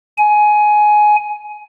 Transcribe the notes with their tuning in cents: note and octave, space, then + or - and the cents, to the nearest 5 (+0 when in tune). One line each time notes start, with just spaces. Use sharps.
G#5 +15